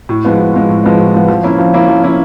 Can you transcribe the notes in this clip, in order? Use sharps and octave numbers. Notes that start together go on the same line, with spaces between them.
A2
F3 G#3 B3
A2
F3 G#3 B3
A2
F3 G#3 B3
A2
F3 G#3 B3
F3
A#3 C#4 E4
F3
A#3 C#4 E4
F3
A#3 C#4 E4